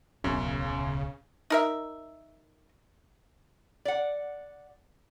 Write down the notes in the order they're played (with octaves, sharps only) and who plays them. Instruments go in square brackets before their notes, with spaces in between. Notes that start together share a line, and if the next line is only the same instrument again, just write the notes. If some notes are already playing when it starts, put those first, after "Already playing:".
[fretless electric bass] D1 B1 B3 [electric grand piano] F#2 [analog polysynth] C#3 [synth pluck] C#4
[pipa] D#4 A#4 E5
[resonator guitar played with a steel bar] D5 F#5